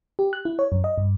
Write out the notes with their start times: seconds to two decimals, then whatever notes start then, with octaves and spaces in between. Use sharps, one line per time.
0.19 G4
0.33 F#6
0.45 E4
0.59 C#5
0.72 F#2
0.84 D#5
0.98 G2